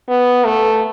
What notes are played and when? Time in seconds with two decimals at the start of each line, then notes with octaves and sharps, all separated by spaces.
0.09 B3
0.45 A3